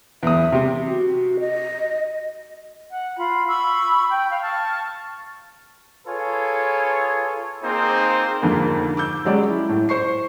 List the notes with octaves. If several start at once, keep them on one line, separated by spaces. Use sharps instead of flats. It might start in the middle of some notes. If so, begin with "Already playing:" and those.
E2 E5 D#6
C3 G4
F#4
D#5
F#5
F4 B5
B5 C#6 E6
G5
F5
A5 C#6 F6
F4 G#4 A4 B4 C#5 G#5
A#3 C4 D#4 F4 G#4 C5
F2 G#2 D3 A#3
D6 E6 G6
F#3 G#3 C#4 G4 D5
E4
A2
C5 C#6 C7